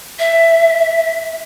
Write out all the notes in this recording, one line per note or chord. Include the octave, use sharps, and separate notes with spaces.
E5